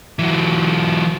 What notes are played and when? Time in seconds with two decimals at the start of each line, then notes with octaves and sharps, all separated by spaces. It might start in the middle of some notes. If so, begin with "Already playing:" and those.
0.19 E3 F#3